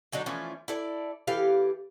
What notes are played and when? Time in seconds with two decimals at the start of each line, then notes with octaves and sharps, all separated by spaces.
0.12 D3 F#3 D4 D#4
0.26 E3 F3 A3 C#4
0.68 E4 A4 D5
1.27 E3 G4 A4 F5